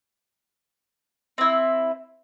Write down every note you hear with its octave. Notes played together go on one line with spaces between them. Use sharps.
C4 E4